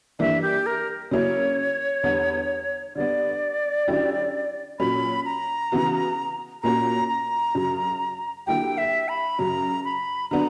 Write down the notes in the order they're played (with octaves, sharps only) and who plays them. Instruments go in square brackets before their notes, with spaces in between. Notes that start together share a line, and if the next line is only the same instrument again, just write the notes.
[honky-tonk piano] G2 E3 A#3 D4 [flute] E5
[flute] G4
A#4
[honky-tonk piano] C#3 F#3 A#3 C#4 E4 [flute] C#5
[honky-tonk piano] E2 D3 G3 B3
[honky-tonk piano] D3 G3 B3 [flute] D5
[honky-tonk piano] D3 F#3 C#4 E4 G4
[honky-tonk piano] A#2 F#3 C#4 [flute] B5
[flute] A#5
[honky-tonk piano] C#3 E3 B3 F#4
[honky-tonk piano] A#2 A#3 C#4 F#4 [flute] A#5
[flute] A#5
[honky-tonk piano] F#2 C#3 F#3
[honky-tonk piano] D3 F#3 A#3 E4 G4 [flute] G5
[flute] E5
B5
[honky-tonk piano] F#2 C#3 F#3 [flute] A#5
[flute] B5
[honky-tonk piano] D3 F#3 B3 D4 [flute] A#5